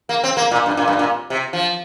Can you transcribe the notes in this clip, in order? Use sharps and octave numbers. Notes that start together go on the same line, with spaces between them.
A#3
C4
A#3
A#2
G2
A#2
G2
A#2
C3
F3